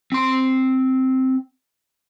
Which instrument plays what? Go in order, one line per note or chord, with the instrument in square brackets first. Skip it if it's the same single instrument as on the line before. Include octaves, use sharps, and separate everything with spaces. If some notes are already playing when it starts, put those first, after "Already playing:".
[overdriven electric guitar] C4 C6